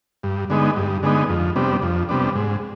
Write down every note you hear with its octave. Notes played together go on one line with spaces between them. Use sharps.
G2
D3 G#3 B3 D#4
G2
D3 G#3 B3 D#4
F2
C3 G3 B3 D4
F2
C3 G3 B3 D4
G#2